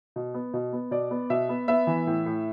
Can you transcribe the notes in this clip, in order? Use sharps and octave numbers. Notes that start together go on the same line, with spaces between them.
B2
B3
B2
B3
B2 D5
B3
B2 E5
B3
B3 E5
E3
A2
A2